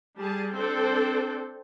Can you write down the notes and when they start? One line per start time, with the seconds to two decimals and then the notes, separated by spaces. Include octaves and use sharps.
0.17 G3 G#4 A5
0.53 C4 D4 A4 C5